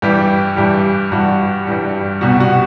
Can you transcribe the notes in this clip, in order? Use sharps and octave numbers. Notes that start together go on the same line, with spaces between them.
G2 E3 G3 G4
G2 E3 G3
G2 E3 G3 F#4
G2 E3 G3
C2 B2 G3 F#4
F#4